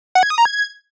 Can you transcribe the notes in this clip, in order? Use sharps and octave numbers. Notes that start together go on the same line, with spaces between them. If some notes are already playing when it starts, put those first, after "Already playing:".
F#5
G#6
D#6
A#5
G#6